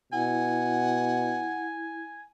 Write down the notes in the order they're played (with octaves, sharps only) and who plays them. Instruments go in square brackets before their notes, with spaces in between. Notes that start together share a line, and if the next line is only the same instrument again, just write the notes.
[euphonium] B2 [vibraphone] E4 [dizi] F#5 [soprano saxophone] G#5